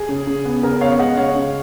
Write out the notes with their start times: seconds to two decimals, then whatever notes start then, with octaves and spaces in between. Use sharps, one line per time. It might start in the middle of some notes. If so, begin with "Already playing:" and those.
Already playing: G#4
0.09 C#3
0.27 C#3
0.46 B3
0.63 C#3 A#4
0.81 B3 C#5 F5
0.99 G#3 D#5 F#5
1.17 C#3 C#5 F5
1.36 C#3